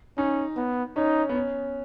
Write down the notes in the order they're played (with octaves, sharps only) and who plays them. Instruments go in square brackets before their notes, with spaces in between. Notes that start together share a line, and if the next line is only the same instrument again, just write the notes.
[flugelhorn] C#4 [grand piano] D#4
[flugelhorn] B3
[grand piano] C#4 [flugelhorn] D#4
[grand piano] B3
C#4